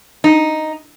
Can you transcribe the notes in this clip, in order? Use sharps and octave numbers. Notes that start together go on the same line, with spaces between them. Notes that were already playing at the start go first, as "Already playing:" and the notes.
D#4